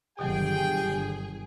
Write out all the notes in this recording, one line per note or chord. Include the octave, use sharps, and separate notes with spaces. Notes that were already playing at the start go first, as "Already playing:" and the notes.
G1 B2 D#3 F#3 G4 G#4 G5